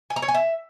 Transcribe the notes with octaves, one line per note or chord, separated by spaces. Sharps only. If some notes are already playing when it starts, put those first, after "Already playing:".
G#5
A#5
C#5
G#5
E5